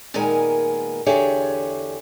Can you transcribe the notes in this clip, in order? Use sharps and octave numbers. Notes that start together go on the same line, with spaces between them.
A#2 D#3 G#3 B3 A#4 G#5
E2 D3 G4 G#4 C#5 E5